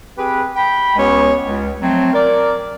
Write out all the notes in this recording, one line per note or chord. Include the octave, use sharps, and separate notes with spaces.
C4 G4 G#4 B4
G5 B5
C#2 G#3 B3 C#4 G4 C#5
C#2
F3 F#3 A3 C4
A#4 D5